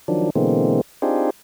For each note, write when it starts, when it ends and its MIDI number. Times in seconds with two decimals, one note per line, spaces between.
0.08 0.30 51
0.08 0.30 53
0.08 0.30 54
0.08 0.30 62
0.36 0.81 47
0.36 0.81 50
0.36 0.81 52
0.36 0.81 56
0.36 0.81 58
0.36 0.81 60
1.02 1.30 60
1.02 1.30 62
1.02 1.30 63
1.02 1.30 65
1.02 1.30 67
1.02 1.30 68